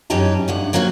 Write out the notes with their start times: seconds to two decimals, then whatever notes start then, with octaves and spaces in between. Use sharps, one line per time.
0.10 F#2 E3 C#4 D#4 G4 A5
0.48 D2 G2 F#5
0.73 C3 F#3 A#3 C4 E4 F#4